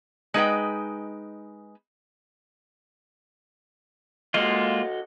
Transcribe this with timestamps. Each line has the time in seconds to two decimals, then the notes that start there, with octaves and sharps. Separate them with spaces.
0.34 G#3 D#4 B4 G5
4.34 G#3 A#3 F4 F#4 A4 D#5